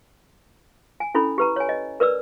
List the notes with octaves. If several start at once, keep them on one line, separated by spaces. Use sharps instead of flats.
G#5
C#4 E4 A4 B5
G4 B4 A#5
C#5 G#5
D#5
A#4 B4 D5 E6